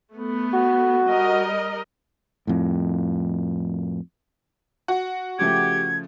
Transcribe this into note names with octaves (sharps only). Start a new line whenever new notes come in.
A3 B3
F#4
G3 A#4 D#5
F2 A2
F#4
C#3 F3 A3 G4 G#6